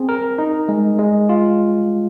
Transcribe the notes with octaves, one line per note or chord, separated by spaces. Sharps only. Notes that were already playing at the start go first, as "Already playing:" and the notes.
Already playing: C4 G#4
A#4
D#4
G#3
G#3
F4